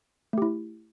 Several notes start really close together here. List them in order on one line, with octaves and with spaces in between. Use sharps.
A3 G4 E4